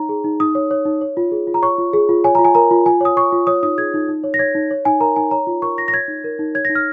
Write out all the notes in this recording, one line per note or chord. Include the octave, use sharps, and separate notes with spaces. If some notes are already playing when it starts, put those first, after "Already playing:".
Already playing: D#4 C#5 A#5
G#4
D#4
D#4 D#6
C#5
C#5
D#4
C#5
F4
G#4
F4
A#5
C#5 C#6
F4
G#4
F4
C#5 G#5
A#5
F4
G#5
A#4 A#5
F4
F4 G#5
C#5 D#6
C#5 C#6
F4
C#5 D#6
D#4 D#6
G#4 G#6
D#4
D#4
C#5
A#6
C#5 G#6
D#4
C#5
D#4 G#5
A#4 A#5
D#4 G#5
C#5 A#5
F4
A#4 C#6
F4 A#6
A#6
C#5 G#6
D#4
A#4
D#4
C#5 G#6
A#6
D#4
F6